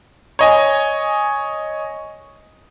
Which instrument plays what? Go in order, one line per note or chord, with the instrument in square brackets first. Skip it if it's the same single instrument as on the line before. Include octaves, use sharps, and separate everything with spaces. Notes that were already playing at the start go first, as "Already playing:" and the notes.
[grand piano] C#5 D#5 G#5